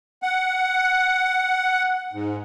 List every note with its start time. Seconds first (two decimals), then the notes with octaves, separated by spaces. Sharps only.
0.22 F#5
2.13 G#2